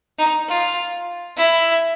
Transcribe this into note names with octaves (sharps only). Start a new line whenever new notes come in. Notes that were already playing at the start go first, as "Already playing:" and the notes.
D#4
F4
E4